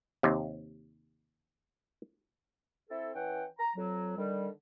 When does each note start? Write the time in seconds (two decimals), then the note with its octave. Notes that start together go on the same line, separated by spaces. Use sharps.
0.23 D#2 C3
2.90 C4 E4 A4
3.15 E3 C#4 F#5 G5
3.59 A#5
3.76 F2 F#3
4.17 D3 D#3 G3